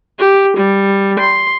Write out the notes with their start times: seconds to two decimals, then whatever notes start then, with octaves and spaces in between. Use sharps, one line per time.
0.19 G4
0.57 G3
1.20 C6